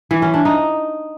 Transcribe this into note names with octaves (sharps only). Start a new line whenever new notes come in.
E3
C#4
D4
D#4